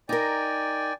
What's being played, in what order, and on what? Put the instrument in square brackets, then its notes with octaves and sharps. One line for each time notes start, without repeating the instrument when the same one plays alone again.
[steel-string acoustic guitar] D#4 A#4 [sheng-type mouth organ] D5 G5 G#5